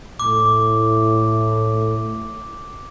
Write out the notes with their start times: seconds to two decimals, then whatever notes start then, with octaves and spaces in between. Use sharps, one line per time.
0.19 A2 D6